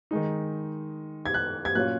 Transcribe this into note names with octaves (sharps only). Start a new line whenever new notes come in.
D#3 G#3 D#4
G#6
F#6
G#6
A#2 F#3 C#4 F4 F#6